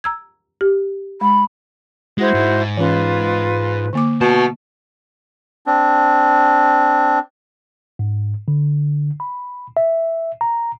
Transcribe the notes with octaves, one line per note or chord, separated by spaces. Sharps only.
A#5 E6 G#6
G4
G#3 B5
G#3 E4 F#4 C5
G#2
E3 C#4 F4 B4
D3 A#3 D6
B2 E5 A5
C4 D4
G#2
D3
B5
E5
A#5